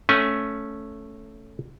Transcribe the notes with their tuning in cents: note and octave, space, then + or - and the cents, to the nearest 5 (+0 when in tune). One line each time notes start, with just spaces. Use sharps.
A3 +0 C#4 +0 G#5 -15